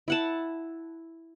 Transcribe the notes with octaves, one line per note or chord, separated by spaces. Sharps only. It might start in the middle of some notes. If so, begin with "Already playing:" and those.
E4 F#5 A5